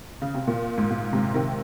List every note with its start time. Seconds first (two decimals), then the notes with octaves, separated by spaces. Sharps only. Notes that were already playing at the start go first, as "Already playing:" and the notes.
0.22 C#3
0.34 C3
0.47 A#2
0.78 G#2
0.91 A#2
1.13 G#2 C3
1.34 C3 D#3